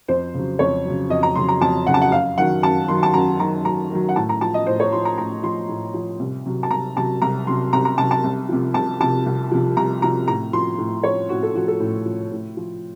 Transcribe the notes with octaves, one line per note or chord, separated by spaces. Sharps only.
F2 C5
C#3 F#3
F2 C#5
C#3 F#3
F2 D#5
A#5
C#3 F#3 C6
A#5
F2 A5
C#3 F#3 F#5
A5
F#5
F#2 F5
D#3 F#3 F#5
F#2 A5
D#3 F#3 C6
A5
F#2 A#5
D#3 F#3 A#5
F#2 A#5
D#3 F#3
F#5
A2 A5
A#5
F3 A5
D#5
A2 C5
C#5
F3 C6
A#5
A2 A#5
F3 C6
A2
F3
C2
C3 F#3
A5
C2 A#5
C3 F#3 A5
C2 A#5
C3 F#3 C6
C2 A#5
A#5
C3 F#3 A5
A5
C2
C3 F3
C2 A5
C3 F3 A5
C2
C3 F3
C2 A#5
C3 F3 A#5
A2 A#5
F3 C6
A2
F3 C#5
A2 F#4
A4
F3 F#4
A4
A2
F3
A2
F3